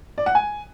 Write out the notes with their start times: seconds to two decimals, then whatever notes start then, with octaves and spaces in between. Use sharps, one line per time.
0.18 D5
0.26 F#5
0.35 G#5